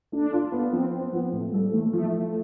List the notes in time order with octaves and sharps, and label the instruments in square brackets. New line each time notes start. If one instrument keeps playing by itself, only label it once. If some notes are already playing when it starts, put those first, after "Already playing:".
[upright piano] A3 [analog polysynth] D4
[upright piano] F4
B3
[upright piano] F3 [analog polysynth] C4
[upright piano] C4
[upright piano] F3 [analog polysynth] B3
[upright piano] A2 [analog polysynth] A3
[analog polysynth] G3 [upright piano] A4
[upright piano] E3 [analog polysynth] A3
[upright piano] F3 [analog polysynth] A3
[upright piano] A3